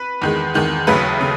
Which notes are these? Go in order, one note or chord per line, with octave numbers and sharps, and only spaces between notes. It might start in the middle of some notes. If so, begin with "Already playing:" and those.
Already playing: B4
E2 D#3 G#3
E2 D#3 G#3
D#2 C#3 F#3 A3 B4
C#3